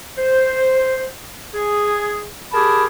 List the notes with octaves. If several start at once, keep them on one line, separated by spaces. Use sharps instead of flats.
C5
G#4
G4 G#4 A#4 A5 B5